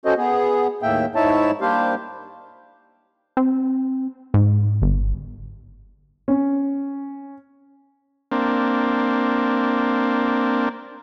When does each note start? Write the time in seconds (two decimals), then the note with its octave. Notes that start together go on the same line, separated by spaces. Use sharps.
0.05 C#4 F#4 A4 C5 D#5
0.17 B3 G#4
0.83 D#2 A2 A#3 E5 G5
1.15 G#2 D#4 E4 C#5 E5 A5
1.61 G3 A#3 D4 G4 C5 F5
3.37 C4
4.34 G#2
4.82 G1
6.28 C#4
8.32 A#3 C4 D4